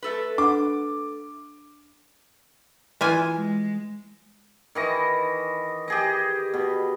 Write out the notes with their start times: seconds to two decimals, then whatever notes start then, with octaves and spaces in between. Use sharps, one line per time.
0.02 A3 A4 B4
0.38 D4 F#5 D6
3.01 E3 F4 G#5
3.35 G#3
4.75 D#3 E3 D#5
5.88 G4 G#4 D#5
6.54 B2